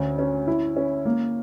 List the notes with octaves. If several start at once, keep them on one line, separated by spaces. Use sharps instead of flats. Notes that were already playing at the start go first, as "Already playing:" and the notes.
Already playing: D2 C#4
C#4
E4
C#4
A#3